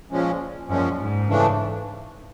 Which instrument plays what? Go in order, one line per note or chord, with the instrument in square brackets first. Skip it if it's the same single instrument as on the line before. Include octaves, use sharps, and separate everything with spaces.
[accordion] A#2 F3 G#3 C#4
[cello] F#2 [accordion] A#2 F3 G#3 C#4
[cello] G#2
[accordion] C#3 E3 A3 D4